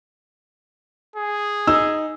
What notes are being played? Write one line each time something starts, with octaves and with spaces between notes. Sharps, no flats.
G#4
D#4 E6